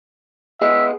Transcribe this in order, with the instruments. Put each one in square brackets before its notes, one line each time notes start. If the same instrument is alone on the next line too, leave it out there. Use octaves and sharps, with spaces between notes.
[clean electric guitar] B3 G#4 D#5 [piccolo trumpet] E5